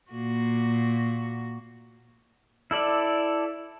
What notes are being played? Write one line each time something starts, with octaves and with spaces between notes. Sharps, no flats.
A#2 A#3 F#4
E4 A4 D5